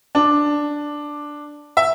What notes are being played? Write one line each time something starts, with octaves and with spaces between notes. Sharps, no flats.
D4
E5